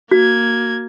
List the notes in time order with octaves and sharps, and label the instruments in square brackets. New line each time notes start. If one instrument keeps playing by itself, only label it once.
[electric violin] A#3 G#6 [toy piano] F#4